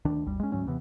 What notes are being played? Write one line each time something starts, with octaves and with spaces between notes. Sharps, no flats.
D2 D#3 D4
G#1 D#2 G3
G#3 C#4
D2 G#2 F#3 C#4
D#2 C3 E3 B3